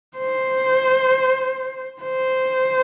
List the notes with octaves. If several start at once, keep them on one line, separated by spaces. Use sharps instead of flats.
C5
C5